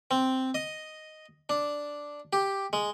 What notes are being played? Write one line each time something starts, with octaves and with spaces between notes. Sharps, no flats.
C4
D#5
D4
G4
G#3